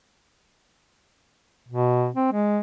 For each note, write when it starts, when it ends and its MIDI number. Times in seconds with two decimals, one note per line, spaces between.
1.68 2.09 47
2.14 2.30 60
2.32 2.61 56